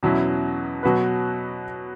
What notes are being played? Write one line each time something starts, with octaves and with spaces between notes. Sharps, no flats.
E2 B2 F#3 C#4 E4
B2 F#3 B3 F#4 B4